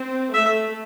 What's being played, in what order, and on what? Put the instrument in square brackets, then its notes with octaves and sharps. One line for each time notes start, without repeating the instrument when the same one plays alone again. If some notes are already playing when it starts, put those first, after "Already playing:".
Already playing: [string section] C4
[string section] A3 [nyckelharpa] E5